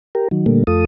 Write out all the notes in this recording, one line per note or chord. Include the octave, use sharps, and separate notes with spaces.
G4 A#4
D#3 F#3
A#2 D3 G3 A3 A#3
F2 A3 F4 A4 D#6